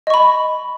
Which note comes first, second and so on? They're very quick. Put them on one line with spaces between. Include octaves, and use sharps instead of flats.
D#5 C#6 B5